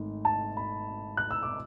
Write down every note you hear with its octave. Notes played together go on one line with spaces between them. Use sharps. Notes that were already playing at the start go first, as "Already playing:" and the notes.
Already playing: G#1 G#2 A3
A5
B5
F#6
E6
D6